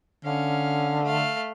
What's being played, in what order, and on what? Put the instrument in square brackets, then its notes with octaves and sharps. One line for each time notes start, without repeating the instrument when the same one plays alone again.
[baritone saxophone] D3 [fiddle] C#4 F5
[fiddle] A3 F5